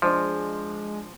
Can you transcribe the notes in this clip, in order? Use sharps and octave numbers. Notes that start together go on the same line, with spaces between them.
F3 G#3 D4 C5 D6